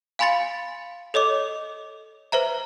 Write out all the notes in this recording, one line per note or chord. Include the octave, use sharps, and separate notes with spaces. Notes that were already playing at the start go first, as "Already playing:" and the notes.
F5 G#5 B5 C6 A6 C#7
A4 C#5 D#5 D6
B4 C5 E5 A#5